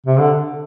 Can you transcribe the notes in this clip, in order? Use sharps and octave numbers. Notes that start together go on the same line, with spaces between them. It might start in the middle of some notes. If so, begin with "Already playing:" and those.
C3
D3